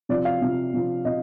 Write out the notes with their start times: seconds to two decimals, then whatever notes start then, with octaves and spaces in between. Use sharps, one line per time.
0.09 C3 F3 D5
0.25 F5
0.42 C3 F3
0.74 C3 F3
1.05 C3 D#5